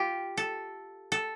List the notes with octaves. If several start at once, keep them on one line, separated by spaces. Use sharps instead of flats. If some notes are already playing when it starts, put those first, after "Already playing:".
Already playing: F4 G4
A4
A4